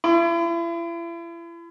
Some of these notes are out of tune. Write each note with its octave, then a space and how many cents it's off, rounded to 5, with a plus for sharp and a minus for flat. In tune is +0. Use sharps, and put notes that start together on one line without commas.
E4 +40